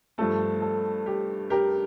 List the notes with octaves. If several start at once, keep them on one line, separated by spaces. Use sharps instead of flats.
G2 F3 A3 A4
A4
G4
G4 A#4